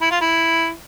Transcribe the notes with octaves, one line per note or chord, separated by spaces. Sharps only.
E4
F4
E4